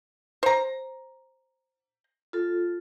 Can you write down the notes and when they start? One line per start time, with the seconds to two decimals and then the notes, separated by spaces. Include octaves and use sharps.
0.43 C5 A#5
2.33 F4 A4